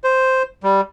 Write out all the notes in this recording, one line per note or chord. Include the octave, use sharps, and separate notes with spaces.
C5
G3